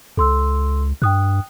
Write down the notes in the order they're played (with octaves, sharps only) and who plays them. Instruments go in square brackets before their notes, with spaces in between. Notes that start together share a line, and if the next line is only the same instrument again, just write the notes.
[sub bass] C#2 [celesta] A4 C6 E6
[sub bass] G2 [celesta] G5 D#6 F#6